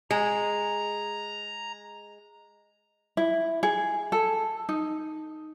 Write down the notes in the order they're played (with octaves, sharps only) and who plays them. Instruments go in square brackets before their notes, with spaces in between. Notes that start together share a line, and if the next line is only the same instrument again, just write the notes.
[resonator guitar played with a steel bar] G#3 [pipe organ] A#5
[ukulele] E4
G#4
A4
D#4